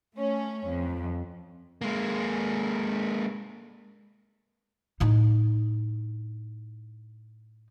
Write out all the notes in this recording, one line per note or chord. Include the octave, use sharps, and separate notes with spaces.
A3 C#4
F2
G#3 A#3
A2 D#4